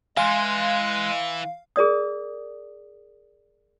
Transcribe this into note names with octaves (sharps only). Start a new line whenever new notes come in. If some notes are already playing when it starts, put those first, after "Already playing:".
E3 G#3 F5 G#5 C6
G#4 A#4 D5 D#6